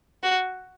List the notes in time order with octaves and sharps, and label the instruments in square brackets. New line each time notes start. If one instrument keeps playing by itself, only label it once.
[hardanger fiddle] F#4